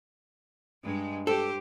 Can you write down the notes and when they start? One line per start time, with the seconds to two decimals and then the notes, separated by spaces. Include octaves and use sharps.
0.84 G2 G#3
1.27 G4 A4 C5